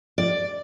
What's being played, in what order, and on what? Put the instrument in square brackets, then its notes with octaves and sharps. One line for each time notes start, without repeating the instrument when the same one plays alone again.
[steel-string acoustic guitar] D5